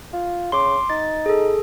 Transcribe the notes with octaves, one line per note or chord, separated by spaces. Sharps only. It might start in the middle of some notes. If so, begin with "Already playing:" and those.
F4
C#3 C6 D6
D#4 A6
G#4 A4